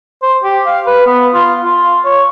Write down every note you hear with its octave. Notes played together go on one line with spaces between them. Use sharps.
C5
G4
F5
B4
B3
F4
F4
C#5